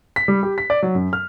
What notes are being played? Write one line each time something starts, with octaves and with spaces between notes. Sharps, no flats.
B6
G3
G4
B6
D5
F#3
F#2
F6